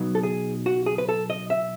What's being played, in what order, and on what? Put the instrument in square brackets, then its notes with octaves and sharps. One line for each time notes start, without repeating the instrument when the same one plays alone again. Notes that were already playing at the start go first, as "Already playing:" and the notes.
Already playing: [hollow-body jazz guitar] B1 F#3 B3 D#4
A4
G#4
F#4
G#4
B4
A4
D#5
E5